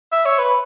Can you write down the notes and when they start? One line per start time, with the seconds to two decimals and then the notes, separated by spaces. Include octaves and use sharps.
0.12 E5
0.25 C#5
0.39 B4